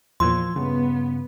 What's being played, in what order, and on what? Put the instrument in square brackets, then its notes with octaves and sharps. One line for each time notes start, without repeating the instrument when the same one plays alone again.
[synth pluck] E2 A#2 [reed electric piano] F3 E6 G#6 [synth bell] C6
[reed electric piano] G2 C#3 [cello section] B3